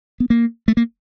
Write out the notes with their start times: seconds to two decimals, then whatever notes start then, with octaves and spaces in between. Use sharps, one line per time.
0.20 B3
0.30 A#3
0.68 A3
0.77 A#3